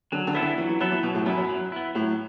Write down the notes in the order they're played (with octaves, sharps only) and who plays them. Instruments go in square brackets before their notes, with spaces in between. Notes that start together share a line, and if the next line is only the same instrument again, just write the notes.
[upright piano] D3 [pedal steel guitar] F#3
[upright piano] D3
[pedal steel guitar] B3 E4 A4
[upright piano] D3
[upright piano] E3 [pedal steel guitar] F#3
[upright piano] E3
[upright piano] F#3 [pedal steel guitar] B3 E4 A4
[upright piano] E3
[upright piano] B2 [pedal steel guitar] F#3
[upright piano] A2
[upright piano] F#2 [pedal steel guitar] B3 E4
[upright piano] F#2
[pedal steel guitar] F#3
B3 E4
[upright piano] A2 [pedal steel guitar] F#3